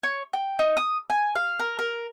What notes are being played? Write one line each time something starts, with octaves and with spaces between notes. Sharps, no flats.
C#5
G5
D#4
D#6
G#5
F5
A#4
A#4